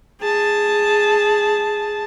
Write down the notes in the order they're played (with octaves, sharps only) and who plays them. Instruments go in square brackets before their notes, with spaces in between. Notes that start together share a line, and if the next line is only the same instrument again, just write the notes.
[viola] G#4 A5